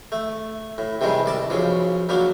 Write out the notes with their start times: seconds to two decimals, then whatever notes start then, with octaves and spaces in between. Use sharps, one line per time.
0.12 A3
0.78 A2
1.01 C3 D#3 E3 G3 G#3
1.26 C2 D5 A5
1.50 B1 C#3 F3
2.09 A#2 F#3 A#3 D4